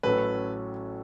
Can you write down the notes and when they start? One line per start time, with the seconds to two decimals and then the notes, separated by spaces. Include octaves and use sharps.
0.03 A1 A2 F#3 C#4 A4 B4